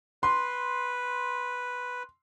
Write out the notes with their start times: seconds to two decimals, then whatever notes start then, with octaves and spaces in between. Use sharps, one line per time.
0.23 B4 C6